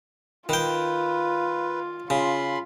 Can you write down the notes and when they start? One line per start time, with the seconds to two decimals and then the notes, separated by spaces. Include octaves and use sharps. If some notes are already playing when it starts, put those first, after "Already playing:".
0.49 D#3 F4 B4 G5
2.10 C#3 F4 B5 C6